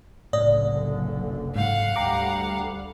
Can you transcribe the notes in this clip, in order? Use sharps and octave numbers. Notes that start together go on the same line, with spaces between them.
F#1 C2 A2 D3 D5 D#6
G#2 F5 F#5
D2 G3 G5 A#5 D6